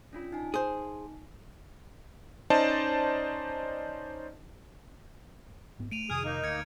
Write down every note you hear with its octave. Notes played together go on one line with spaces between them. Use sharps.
C#4 D4 F4
D#4 G#5
G#4 C5
C#4 D#4 C5 D5 D#5 A5
G#2 B3
A3 D7 D#7 F7
F2 C3 D#3 G#4 D#6 F6
A#3 D#4
D2 F6 G#6 C#7